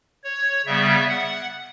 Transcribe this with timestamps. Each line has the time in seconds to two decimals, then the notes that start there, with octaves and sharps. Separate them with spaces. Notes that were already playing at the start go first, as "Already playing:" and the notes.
0.24 C#5
0.66 C#3 G3 B3 E5
1.09 F#5